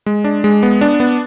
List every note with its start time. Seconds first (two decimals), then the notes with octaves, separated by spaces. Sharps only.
0.06 G#3
0.24 D4
0.44 G#3
0.63 B3
0.81 D4
1.00 B3